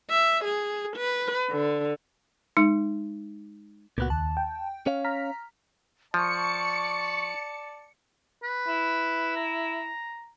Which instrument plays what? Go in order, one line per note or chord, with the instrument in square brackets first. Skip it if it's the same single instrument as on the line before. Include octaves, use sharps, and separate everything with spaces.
[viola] E5
G#4
B4
D3
[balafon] G#3 D#4
[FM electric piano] C#2 F#6 [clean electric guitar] A#2 B3 F#4
[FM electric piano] D#2 [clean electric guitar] A5
[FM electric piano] G5
[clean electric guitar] C#4 C#5 F5
[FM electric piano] A#5 F6 B6
[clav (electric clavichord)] F3 [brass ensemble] D5 A5 [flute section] C#6 [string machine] C#7
[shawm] B4
[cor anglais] E4
[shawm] A#5